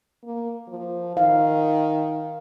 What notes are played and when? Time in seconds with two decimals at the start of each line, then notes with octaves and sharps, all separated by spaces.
0.24 A#3
0.68 F3
1.17 D#3 F5